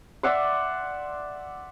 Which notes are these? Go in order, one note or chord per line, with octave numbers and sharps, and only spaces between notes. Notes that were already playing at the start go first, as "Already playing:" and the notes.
D5 E5 F#5 C6